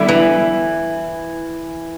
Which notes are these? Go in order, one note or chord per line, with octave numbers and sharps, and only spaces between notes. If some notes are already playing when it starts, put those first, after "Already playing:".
Already playing: D3 G3 B3 E4
E3